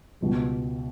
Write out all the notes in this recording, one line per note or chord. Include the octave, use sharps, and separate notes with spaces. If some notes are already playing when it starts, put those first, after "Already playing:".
C#2 B2 G3